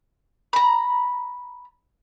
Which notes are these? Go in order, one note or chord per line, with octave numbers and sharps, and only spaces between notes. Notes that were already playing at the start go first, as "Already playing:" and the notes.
A#5 B5